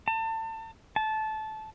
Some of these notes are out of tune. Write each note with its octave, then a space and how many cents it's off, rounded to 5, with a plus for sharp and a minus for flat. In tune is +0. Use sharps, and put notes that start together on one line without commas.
A5 +30
A5 -15